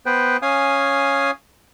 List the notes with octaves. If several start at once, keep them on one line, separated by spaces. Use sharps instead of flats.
B3 B4 C5 G5
C#4 F5 G#5 D#6